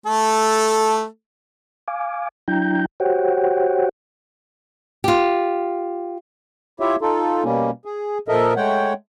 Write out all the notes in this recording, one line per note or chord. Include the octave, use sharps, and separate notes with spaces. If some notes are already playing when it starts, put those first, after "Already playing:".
A3 A4
F5 G#5 D6
F#3 D4 E4 G5 A#5 G6
F#4 G4 C5 C#5 F#5 G5
F4 G4
E4 F4 G4 C#5 E5
D#4 F4 A4
B2 G3 A#3 C#4
G#4
A#2 F3 A4 A#4 D#5 E5
G#3 A3 C#5 F#5 G5